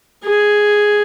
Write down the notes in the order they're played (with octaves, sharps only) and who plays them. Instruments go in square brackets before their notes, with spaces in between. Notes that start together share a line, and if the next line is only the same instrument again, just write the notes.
[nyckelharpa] G#4